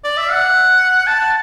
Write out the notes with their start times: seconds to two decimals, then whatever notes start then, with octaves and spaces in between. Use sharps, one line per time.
0.04 D5
0.17 E5
0.31 F#5
1.07 A5